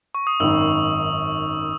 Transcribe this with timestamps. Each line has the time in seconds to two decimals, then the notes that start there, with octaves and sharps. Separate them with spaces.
0.15 C#6
0.27 D#6
0.40 G#1 F#2 D#3 E6